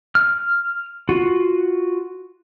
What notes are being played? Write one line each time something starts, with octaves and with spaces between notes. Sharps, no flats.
F6
F4 F#4